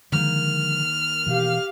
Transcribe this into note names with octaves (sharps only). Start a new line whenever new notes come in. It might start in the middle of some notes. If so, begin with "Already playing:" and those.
D3 D#3 F3 G#3 A#3 F6
B2 E3 G4 F5